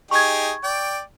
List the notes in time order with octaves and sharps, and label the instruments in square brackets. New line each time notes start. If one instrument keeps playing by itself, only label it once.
[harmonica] D#4 G4 G#4 [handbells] C#6 G#6
[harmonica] D5 G5